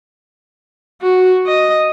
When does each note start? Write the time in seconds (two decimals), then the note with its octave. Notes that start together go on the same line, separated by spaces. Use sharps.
1.03 F#4
1.47 D#5